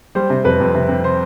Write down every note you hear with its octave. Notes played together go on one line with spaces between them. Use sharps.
G3 C5
C3
F2 B4
F2
C3
C3
C5